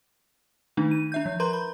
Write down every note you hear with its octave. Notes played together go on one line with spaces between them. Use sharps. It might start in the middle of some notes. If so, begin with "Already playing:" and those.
D#3 A3 D4 D#4
D#7
D4 E5 G6
F3
A#4 B4 A#5 C6 G6
B5